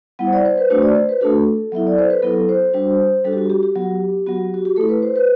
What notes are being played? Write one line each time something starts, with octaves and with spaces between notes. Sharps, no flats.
G3 B3 E4 F#5
C5
D5
C5
B4
A3 D4 F#4 C5
D5
C5
B4
A3 D4 F#4 A4
F#3 B3 E4 E5
D5
C5
B4
F#3 B3 E4 A4
C5
G3 D4 F#4
G3 D4 F#4 A4
G4
F#4
G4
G4
F#3 B3 F#4
F#3 B3 F#4
F#4
G4
A3 E4 A4
B4
C5
B4